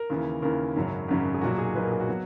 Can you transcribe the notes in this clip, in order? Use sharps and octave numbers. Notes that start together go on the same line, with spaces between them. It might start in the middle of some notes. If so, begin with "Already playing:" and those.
Already playing: A#4
D#2 C#3 E3
D#2 C#3 E3 A#4
G#1 F#2 C#3 F#3
G#1 F#2 C#3 F#3
G#4
B1 A#2 F#3 F#4
G#4
B1 A#2 F#3 B4
A#4
G#4
F#4
B2 F#3